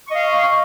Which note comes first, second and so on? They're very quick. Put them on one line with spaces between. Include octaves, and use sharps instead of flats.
C#6 D#5 F5